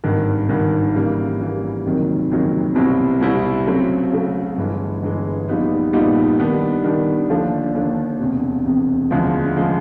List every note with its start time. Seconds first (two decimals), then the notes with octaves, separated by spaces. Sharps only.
0.04 G#1 G2 D#3
0.49 G#1 G2 D#3
0.94 C#3 E3 G3 A#3
1.40 C#3 E3 G3 A#3
1.85 F#1 F2 C3 D#3 F#3
2.31 F#1 F2 C3 D#3 F#3
2.75 C2 B2 G3 C4 E4
3.21 C2 B2 G3 C4 E4
3.66 C#3 F#3 A3 C4
4.12 C#3 F#3 A3 C4
4.57 G1 G2 E3 G#3
5.02 G1 G2 E3 G#3
5.48 A#1 A#2 G3 B3 D#4
5.93 A#1 A#2 G3 B3 D#4
6.38 D#3 G3 B3 D4
6.84 D#3 G3 B3 D4
7.29 D#2 D3 F3 A3 D4
7.75 D#2 D3 F3 A3 D4
8.20 E1 E2 C3
8.66 E1 E2 C3
9.11 E1 D2 C#3 F3 G#3
9.56 C#3 F3 G#3